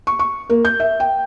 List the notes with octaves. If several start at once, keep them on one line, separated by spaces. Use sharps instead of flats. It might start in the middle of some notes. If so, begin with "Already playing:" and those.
C#6
C#6
A#3
G6
E5
G5